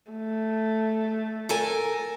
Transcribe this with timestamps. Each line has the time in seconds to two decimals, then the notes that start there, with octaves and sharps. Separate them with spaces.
0.12 A3
1.49 A4 A#4 G#5